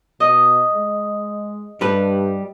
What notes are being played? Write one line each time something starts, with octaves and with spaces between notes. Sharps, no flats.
B2 D#5
G#3
G2 G3 A4 B4